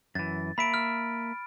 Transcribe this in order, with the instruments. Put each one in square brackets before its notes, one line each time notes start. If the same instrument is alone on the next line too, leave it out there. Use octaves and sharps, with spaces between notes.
[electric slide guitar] F#2 E3 [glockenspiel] A6
[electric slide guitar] A#3 E5 [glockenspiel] B5 D7
[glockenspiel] F6